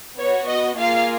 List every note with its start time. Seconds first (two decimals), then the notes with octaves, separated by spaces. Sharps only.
0.17 B3 F#4 C#5
0.47 D#5
0.77 A#3 F4 G#4 F5